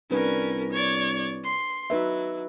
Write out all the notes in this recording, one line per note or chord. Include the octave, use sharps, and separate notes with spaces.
C2 C#4 D4 A#4 B4
C#5 D5
C6
F#3 D#4 B4 E5